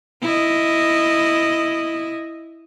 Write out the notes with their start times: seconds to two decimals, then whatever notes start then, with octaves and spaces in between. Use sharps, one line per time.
0.22 E4 D#5